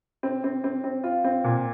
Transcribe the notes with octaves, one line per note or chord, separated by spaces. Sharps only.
C4
C4
C4
C4
F4
C4
A#2